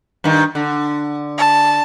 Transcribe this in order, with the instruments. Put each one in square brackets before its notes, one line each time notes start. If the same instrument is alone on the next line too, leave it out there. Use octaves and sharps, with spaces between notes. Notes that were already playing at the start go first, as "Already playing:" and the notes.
[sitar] G2 D#3
D3
[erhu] A5